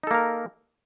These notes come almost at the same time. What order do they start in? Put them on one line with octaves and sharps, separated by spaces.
D#4 A4 A#3 A#4